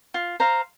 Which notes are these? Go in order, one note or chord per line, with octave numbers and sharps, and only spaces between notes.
F4
C5 F5 A#5